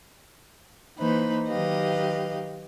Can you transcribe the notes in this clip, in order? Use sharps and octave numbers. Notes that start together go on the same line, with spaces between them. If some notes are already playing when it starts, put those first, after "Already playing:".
E3 A#3 D#4 B4 C5
D#3 F#3 G4 B4 D#5 F5